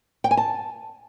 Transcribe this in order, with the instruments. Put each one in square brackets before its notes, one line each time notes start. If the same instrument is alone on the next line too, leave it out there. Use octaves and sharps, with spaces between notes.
[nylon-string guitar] G5
G#5
A5